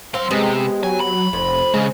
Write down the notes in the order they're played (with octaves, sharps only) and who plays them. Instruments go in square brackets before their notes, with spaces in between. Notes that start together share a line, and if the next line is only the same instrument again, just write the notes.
[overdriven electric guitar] F#3 C6 [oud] C4 F5
[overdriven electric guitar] C3 [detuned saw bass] G#3 [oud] B3 G4
[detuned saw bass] F#3 [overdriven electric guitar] G#5
[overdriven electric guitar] B5
[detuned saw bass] F1 [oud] F2
[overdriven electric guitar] C#3 [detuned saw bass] G#3